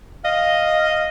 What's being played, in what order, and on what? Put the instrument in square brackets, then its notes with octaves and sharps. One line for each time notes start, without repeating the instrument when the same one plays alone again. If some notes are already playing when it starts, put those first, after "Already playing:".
[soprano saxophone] D#5 [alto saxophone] F5